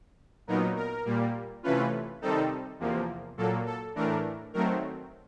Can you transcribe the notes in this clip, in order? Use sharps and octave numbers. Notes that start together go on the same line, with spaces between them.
A#2 F#3 B3 D#4 A#4
A#4
A#2 G3 A#3
C3 E3 A3 C#4 F4 B4
C3 D#3 G3 C4 D#4 A4
E2 C3 F3 A#3
A#2 F#3 A#3 A4
A4
A2 E3 A3 D4 A#4
D#3 F#3 A3 C4 A#4